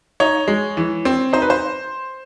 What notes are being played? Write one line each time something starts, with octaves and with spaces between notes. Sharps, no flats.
D#4 C#5
G#3
E3
C4
D#4 C5
B4
C5